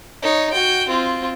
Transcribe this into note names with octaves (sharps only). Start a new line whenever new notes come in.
D#4 C#5
F#4 G5
C4 F4